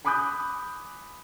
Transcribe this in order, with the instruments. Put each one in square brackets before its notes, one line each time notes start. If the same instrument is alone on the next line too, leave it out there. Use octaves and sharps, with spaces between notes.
[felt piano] G#5 B5 D6 D#6 F#6 G6